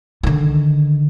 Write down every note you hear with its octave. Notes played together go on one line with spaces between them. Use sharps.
D3 D#3